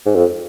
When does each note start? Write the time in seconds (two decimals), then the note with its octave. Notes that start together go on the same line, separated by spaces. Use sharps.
0.06 G#2
0.15 F2